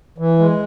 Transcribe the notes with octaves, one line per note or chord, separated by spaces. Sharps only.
E3
G#3